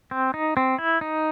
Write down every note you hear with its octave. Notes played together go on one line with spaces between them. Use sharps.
C4
D#4
C4
E4
D#4